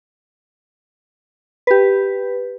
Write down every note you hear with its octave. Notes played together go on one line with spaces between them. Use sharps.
G4 B4